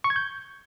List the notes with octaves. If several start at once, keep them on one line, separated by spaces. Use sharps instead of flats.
C#6
G#6
G6